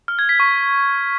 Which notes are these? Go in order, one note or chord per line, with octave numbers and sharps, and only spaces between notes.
F6
G#6
B6
C#6